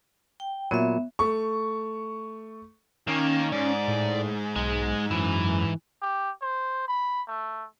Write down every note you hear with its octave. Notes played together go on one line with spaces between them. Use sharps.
G5
A#2 F#3 B3 E5
A3 C#6
D#3 A#3 C#4
G#2 D5
A2
B1 G#3
F#2 E3
G4
C5
B5
A3